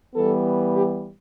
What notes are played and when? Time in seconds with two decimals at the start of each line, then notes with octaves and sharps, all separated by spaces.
0.13 E3 G3 B3 A4
0.74 G4